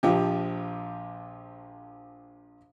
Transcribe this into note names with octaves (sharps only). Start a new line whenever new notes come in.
A#1 F3 G4